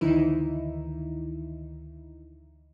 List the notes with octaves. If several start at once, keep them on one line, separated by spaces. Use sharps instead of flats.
D2 D#3 E3 D#4 E4